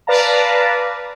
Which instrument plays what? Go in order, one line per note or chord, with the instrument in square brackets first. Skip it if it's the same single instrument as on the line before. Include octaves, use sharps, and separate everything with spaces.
[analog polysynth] B4 D5 F5 A5 A#5